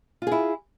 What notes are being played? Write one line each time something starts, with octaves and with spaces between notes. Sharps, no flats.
E4 F4 G#4